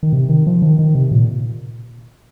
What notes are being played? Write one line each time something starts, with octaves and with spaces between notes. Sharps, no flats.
D#3
C3
D#3
F3
D#3
D#3
C3
A#2